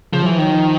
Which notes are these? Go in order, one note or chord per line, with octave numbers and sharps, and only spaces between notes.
C#3 F3
E3 F#3
F3
D#3 F#3
F3